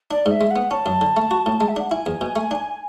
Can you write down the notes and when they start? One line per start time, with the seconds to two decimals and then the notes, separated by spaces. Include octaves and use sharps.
0.11 D4 D5
0.26 G#2 E5
0.41 G#3
0.51 F#5
0.56 B3
0.71 C#4 A5
0.86 F#2
1.01 D3
1.17 A3
1.31 F#4
1.46 A2
1.61 G#3
1.68 E5
1.76 D4 F#5
1.91 E4 G#5
2.06 E2
2.21 B2
2.36 A3
2.51 D4